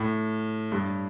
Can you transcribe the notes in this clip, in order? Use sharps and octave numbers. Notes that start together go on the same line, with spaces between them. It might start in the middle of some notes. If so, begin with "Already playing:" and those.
Already playing: A2
G2